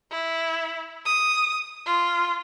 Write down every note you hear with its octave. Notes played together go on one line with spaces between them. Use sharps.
E4
D#6
F4